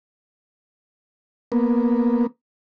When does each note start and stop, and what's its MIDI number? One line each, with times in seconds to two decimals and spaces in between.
1.52 2.27 58
1.52 2.27 59